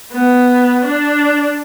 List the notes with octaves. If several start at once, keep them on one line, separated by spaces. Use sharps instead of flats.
B3
D4